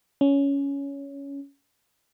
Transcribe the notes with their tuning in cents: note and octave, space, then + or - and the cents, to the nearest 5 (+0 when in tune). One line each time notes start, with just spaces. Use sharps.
C#4 +10